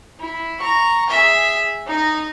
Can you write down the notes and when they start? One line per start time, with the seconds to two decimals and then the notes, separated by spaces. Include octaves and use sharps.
0.20 E4
0.59 A#5 C#6
1.10 G#4 E5
1.87 D#4 D#5